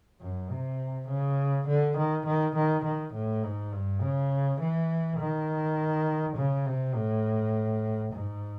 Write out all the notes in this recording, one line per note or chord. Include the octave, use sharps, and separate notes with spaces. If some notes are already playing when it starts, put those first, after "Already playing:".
F#2
C3
C#3
D3
D#3
D#3
D#3
D#3
A2
G#2
G2
C#3
E3
D#3
C#3
C3
A2
G#2